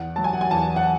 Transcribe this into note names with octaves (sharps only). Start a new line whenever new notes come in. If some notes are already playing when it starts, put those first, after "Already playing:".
Already playing: E2 F#5
F#3 A5
G#5
F#5
G#5
E2 A5
F#5